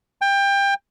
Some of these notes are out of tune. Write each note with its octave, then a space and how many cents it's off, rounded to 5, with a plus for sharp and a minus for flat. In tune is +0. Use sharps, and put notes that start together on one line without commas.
G5 +25